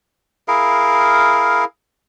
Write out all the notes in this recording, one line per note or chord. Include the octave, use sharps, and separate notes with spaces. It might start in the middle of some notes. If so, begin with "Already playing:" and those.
E4 G#4 A#4 F5